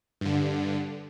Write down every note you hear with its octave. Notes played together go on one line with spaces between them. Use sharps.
G2 D3